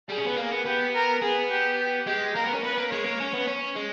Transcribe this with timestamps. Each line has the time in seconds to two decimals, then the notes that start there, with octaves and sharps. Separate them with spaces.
0.09 G3 G#4
0.18 C#4
0.27 B3
0.38 A#3
0.52 B3
0.66 B3 G4
0.94 A#4
1.22 B3 G#4
1.50 G4
2.07 G#3 G4
2.35 A#3 A#4
2.44 B3
2.54 C#4
2.63 B3 B4
2.77 A#3
2.91 G#3 C#5
3.06 A#3
3.20 C#4
3.34 B3
3.48 C#4
3.76 G#3